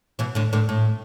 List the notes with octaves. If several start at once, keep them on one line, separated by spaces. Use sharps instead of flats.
B2 E3
A2 D3
A2 D3
A2